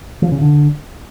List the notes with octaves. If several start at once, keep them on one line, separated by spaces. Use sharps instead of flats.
F3
C#3
D3